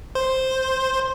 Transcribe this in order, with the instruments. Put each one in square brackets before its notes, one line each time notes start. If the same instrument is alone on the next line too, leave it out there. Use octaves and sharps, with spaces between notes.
[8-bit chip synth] C5